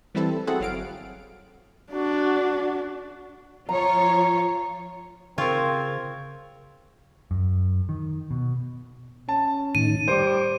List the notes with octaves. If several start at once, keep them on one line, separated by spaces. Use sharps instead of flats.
E3 G3 C4 E4 A4
C4 E4 F#4 G#4 A4 F#5
G1 F#3 F5 D7
D4 F#4
F3 F4 C#5 A#5
C#3 C4 F4 A#4 C#6 G#6
F#2
D#3
B2
C#4 A5
A2 D#3 D#7
G3 C5 D6